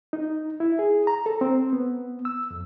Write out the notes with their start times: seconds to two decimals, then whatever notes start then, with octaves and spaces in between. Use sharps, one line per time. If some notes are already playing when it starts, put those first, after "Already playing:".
0.13 D#4
0.60 E4
0.79 G#4
1.07 A#5
1.26 A4
1.41 C4
1.73 B3
2.25 E6
2.51 F2